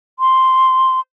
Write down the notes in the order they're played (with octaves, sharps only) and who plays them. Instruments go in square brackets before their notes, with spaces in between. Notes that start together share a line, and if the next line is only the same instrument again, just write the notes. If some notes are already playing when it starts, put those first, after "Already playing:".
[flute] C6